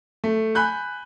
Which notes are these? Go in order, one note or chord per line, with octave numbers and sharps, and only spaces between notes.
A3
G#5 B5 F#6 G6